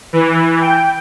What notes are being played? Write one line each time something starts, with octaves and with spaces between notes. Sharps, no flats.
E3
G5